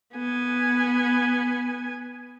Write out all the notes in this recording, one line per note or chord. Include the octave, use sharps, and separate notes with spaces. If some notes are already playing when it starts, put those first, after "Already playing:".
B3 G#5